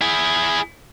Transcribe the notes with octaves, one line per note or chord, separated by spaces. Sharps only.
E4 G#4